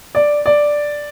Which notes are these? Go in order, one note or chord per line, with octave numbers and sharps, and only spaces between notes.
D5
D5